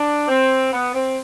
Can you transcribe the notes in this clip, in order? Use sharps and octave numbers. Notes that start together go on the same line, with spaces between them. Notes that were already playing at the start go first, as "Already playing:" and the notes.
Already playing: D4
C4
B3
C4